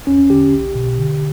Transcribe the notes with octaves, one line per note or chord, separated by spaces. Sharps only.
E2 C#4
D3 G4
B1
B2
D3